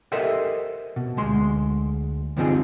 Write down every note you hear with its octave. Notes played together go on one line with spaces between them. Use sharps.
G4 A4 A#4 C5 D#5 E5
B2
D2 G#3 C6
G2 D3 F3 C4 D#4 G#4